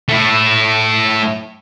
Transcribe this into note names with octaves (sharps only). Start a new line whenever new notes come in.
A3 E4